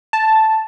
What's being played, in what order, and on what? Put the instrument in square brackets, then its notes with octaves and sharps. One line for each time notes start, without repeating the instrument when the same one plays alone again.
[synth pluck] A5